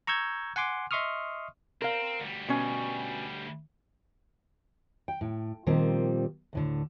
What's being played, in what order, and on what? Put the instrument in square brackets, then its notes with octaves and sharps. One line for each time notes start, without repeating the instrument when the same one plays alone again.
[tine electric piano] A#5 C#6 E6 G6 G#6
F#5 G#5 C6 D6
D#5 E5 C6 C#6 D#6 F6
[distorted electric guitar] C4 [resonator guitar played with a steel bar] A#4 F5
[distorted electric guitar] D2 G3
[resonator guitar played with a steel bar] B2 C#4 G#5
[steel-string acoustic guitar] G5
A2
A#2 D#3 F3 G3 A#3 C4
D2 A2 D3